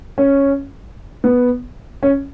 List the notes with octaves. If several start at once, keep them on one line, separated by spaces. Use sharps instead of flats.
C#4
B3
C#4